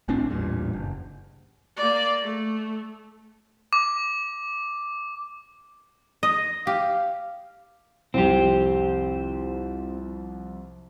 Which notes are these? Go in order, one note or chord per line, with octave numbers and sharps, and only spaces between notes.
G#1 A2 C4 D4
A1 E2 G2 A#2
F#1
A#3 D5
A3
D6
D#5
G4 F5
C2 F2 C4 G4